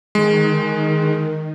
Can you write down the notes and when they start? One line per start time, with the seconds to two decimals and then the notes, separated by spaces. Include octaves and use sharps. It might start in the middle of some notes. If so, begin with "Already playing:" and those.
0.15 D#3 G#3